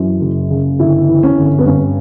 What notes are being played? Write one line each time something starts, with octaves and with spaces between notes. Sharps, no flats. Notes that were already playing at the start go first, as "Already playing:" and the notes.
Already playing: F#2 E3
F#1
C#3
G1 E4
E3
C#4
G1
B3
G2 C#4